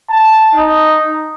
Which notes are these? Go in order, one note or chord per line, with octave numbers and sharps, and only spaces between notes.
A5
D#4